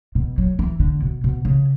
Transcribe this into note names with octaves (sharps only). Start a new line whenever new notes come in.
B2
F#3
E3
D3
B2
B2
C#3